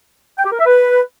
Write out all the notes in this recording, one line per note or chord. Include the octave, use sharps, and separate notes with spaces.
G5
G4
A#4
E5
B4